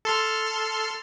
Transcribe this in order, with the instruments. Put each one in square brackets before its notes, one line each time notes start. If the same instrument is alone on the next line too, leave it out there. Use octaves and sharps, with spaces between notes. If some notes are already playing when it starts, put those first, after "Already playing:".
[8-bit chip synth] A4 C6 F6